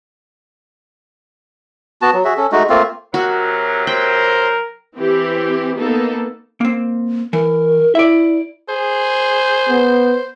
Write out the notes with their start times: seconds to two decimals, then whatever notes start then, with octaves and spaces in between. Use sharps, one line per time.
2.02 B3 F#4 A5
2.13 F#3
2.25 F#4 G#4 E5
2.37 C#4 A4
2.52 G#3 A3 D#4 F#4
2.69 A3 A#3 C4 F4
3.14 C3 F#3 F#4 A#4
3.87 A#4 C5 G5
4.96 E3 C4 G4
5.79 A#3 B3 D#4 A4
6.61 A#3 C4
7.33 E3 A#4
7.95 E4 D5 E5
8.69 G#4 C5
9.69 B3